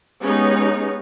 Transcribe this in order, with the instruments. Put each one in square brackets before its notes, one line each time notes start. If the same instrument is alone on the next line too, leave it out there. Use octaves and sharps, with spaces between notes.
[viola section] G#3 B3 C#4 D#4 G4